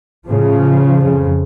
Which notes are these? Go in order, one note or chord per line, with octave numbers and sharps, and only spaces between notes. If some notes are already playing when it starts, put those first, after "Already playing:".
A2 C#3 F3
F2 C#3